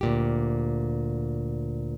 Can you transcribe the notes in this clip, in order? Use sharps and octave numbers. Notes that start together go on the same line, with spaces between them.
D2 A#2 G4